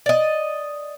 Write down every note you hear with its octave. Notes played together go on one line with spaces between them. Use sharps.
D5 D#5